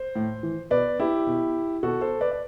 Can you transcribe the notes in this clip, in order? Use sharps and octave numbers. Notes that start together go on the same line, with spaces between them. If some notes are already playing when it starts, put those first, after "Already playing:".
Already playing: C5
A2
E3
B2 B4 D5
E4 G4
B2
B2 F#4 A4
A4 C5
B4 D5
D5